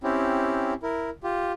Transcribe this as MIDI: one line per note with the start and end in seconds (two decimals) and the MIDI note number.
0.04 0.73 60
0.04 0.73 61
0.04 0.73 64
0.04 0.73 67
0.83 1.10 64
0.83 1.10 70
1.23 1.52 65
1.23 1.52 67